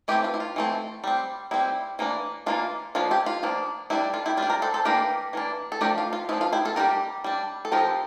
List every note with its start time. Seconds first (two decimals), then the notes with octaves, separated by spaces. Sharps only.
0.08 E3 A3 C4 E4 G4
0.24 F4
0.34 E4
0.40 F4
0.56 E3 A3 C4
1.04 G3 C4
1.51 G3 C4 E4
1.99 E3 A#3 D4
2.46 E3 A#3 D4 F4
2.95 F3 A#3 D4 F4
3.11 E4 G4
3.26 F4
3.43 F3 A#3 D4
3.90 G3 D4 E4
4.14 F4 A4
4.26 E4 G4
4.37 G3 F4
4.43 D4
4.50 A#4 D5
4.62 A4 C5
4.74 A4 C5
4.85 E3 A#3 D4 G4 A#4
5.33 E3 A#3 D4
5.72 A4
5.81 F3 A3 D4 G4 A#4
5.98 F4
6.13 F4
6.29 F3 A3 D4 E4
6.41 F4
6.53 E4 G4
6.65 F4 A4
6.76 G3 D4 G4 A#4
7.24 G3 D4
7.65 A4
7.72 F3 C4 G4 A#4